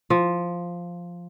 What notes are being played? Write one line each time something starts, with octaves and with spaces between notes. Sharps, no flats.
F3